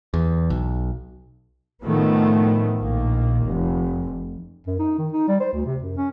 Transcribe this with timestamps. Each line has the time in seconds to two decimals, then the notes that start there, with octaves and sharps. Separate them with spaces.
0.14 E2
0.50 B1
1.83 A2 D#3 F3 A3 B3
2.78 A#1 D#3 A#3
3.47 F1
4.67 F#2
4.80 D#4
4.98 D#3
5.12 D#4
5.28 G3
5.40 C5
5.53 D2
5.66 C3
5.82 F#2
5.97 C#4